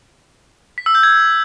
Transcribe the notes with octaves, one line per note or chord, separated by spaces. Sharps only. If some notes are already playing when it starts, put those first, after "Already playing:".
B6
E6
G6
G#6